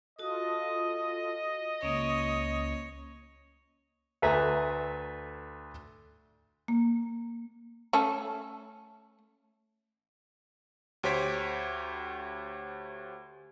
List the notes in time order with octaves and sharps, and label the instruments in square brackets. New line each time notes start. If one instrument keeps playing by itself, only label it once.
[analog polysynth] F4 A4 [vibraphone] F#4 D#6 [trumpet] D#5
[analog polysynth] C#2 [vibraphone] A#3 C#4 [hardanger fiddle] C#5
[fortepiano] D2 A3 B4 E5 G#5 A#5
[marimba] A#3
[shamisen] A3 C#4 A4
[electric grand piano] D2 G4 C5 C#5 B6 D7